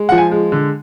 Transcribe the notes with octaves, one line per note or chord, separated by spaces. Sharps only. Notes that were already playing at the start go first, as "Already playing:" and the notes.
Already playing: G#3
F3 F#5
G#5
G#3
D3